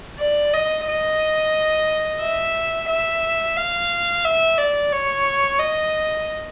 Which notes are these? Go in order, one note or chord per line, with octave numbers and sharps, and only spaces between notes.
D5
D#5
D#5
E5
E5
F5
E5
D5
C#5
D#5